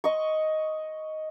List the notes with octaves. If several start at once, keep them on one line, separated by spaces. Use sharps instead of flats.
D#5 C#6